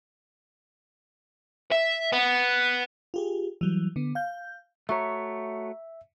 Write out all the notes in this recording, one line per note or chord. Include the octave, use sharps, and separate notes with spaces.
E5
B3
F4 G4 G#4
E3 F#3 G3
D3 B3
F5 G6
A3 F#4 C#5 E5 A#5 C#6